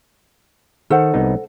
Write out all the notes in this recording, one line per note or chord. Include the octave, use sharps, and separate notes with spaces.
D#3 A4 C5 F#5
C2 B3 D#4